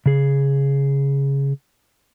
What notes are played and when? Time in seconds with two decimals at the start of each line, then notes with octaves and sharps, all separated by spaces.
0.06 C#3 G#4